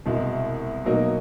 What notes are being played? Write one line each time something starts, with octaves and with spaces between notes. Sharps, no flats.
C2 B2 G#3
B2 F#3 A#3 D#4